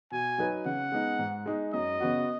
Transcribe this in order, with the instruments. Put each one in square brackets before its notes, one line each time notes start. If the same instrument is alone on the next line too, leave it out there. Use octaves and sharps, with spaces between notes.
[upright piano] B2 [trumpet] G#5
[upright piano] F#3 D#4 B4
[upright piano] C#3 [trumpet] F#5
[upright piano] G#3 B3 D#4
G#2
G#3 D#4
[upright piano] F#2 [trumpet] D#5
[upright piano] C#3 B3 F#4